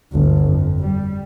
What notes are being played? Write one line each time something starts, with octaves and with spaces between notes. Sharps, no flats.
G1 D2
F2
G3